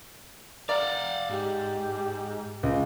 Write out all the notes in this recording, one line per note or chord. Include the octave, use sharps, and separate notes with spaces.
D5 F5 F#5 A#5
G#2 G4
C#2